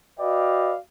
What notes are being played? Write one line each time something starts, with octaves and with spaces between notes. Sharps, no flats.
F#4 B4 D5 D#5 F5 G5